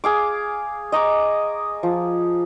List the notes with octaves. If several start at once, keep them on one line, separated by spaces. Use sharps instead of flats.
G#4 F5 D6
D#5 A#5 C#6 D6
F3